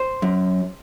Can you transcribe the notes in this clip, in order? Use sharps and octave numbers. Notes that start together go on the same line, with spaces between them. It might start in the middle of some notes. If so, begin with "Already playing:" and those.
Already playing: C5
F#2